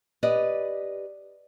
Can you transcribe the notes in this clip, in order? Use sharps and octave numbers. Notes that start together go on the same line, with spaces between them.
G4 B4 D5 D#5